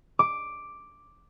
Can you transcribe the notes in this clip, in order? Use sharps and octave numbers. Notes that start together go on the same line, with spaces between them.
D6